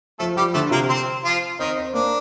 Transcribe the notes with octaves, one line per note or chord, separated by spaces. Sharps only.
F3 A3 A4
F3 G3 G4
D3 A3 A4
C3 A#3 A#4
C4 C5
F3 F4
D#3 C4 D#4
C4
A#3 D4